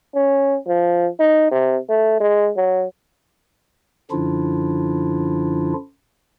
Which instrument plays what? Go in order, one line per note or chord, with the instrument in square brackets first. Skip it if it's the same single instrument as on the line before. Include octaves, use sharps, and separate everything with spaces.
[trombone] C#4
F3
D#4
C3
A3
G#3
F#3
[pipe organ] F#2 D3 F3 D4 E4 F4